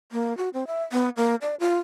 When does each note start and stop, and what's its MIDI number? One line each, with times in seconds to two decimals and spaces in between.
0.12 0.36 58
0.37 0.49 66
0.54 0.67 60
0.67 0.82 76
0.92 1.09 59
1.17 1.35 58
1.42 1.55 74
1.60 1.78 65